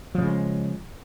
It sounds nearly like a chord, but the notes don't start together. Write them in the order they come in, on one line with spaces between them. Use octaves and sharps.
F3 C#3 G#3